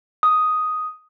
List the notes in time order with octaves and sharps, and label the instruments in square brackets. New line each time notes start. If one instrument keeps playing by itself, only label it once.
[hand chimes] D#6